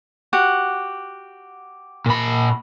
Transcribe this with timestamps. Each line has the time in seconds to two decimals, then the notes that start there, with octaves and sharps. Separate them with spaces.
0.33 F#4 G4 F#5
2.06 A#2 B5